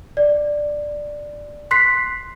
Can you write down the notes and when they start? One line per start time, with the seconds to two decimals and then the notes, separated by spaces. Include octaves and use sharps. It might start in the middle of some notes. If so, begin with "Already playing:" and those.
0.17 D5
1.71 C6 F#6 B6 C7